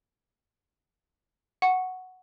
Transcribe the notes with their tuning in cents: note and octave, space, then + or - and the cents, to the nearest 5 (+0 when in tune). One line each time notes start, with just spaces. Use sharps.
F#5 +0 C#6 +0